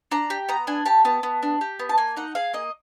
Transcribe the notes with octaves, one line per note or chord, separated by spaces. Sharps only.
D4 A#5
G4
B3 A#5
D4 G#5
G4 A5
B3 A5
B3
D4
G4
B3
A5
A#3 G#5
D#4 F#5
G#4 F5
A#3 D#5